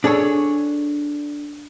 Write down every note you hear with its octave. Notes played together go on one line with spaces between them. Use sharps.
D4 G#4 A4 C#5